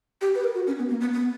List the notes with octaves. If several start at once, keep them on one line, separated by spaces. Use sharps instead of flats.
G4
B4
A#4
F#4
C#4
B3
A#3
B3
B3